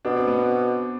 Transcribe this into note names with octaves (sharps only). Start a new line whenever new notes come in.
B2 D4
C4
B3
C4